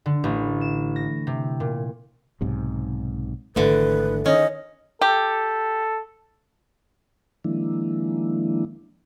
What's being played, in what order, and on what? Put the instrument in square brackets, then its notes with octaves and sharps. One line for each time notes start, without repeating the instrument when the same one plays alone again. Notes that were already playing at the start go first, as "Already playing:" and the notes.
[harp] D3
A1
E7
A#6
C3
A#2
[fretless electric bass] B1 G#2 C3
[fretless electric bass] G#1 F2 A3 [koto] D3 E3 [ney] B4
[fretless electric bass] D#3 [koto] C#4 [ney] D#5
[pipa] G4 [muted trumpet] A4
[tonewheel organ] D#3 F3 G#3 A#3 D4 E4